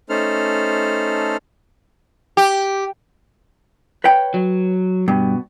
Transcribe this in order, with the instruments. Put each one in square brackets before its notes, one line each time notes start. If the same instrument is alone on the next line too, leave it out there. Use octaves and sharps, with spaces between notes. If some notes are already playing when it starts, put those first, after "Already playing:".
[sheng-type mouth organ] A3 C#4 D#4 A4 C5 F6
[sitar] G4
[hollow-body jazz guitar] B4 C#5 G5
[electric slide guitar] F#3
[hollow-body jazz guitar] G2 [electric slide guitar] B2